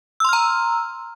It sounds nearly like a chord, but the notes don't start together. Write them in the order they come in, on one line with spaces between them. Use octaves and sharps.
E6 C6 F6 A#5